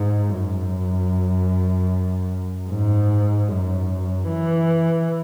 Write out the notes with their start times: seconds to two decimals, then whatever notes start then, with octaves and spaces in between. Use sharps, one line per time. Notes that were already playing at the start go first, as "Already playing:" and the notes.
Already playing: G#2
0.30 F#2
2.69 G#2
3.48 F#2
4.28 E3